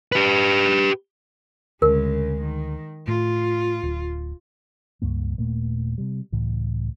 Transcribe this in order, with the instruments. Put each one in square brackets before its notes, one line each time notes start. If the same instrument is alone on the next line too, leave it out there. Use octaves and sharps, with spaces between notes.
[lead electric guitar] G4 B4
[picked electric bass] D2 [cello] C#3 G#3 [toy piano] A#4
[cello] D#3
[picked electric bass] A2 [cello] F4
[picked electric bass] D1
[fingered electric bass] C#2 G2 A#3
D#1 A#2 A3 A#3
C3 G3
C#2 A2 E3